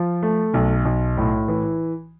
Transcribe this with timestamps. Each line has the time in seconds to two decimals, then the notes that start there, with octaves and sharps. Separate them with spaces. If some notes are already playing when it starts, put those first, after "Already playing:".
Already playing: F3
0.22 A3
0.54 B1
0.85 B1
1.17 A2
1.48 E3